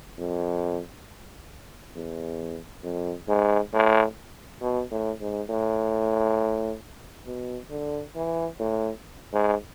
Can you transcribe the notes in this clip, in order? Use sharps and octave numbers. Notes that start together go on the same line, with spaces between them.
F2
E2
F2
G#2
A2
B2
A2
G#2
A2
B2
D3
E3
A2
G#2